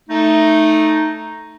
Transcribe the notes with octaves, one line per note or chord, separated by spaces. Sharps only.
A3 D#4